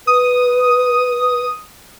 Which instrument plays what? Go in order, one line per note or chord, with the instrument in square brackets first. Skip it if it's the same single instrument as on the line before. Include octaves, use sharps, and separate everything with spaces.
[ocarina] B4 [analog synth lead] D#6